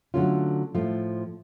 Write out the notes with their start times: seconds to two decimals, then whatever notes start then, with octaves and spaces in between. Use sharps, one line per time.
0.14 D3 F#3 A3 C#4 F4
0.75 A2 F3 A3 F4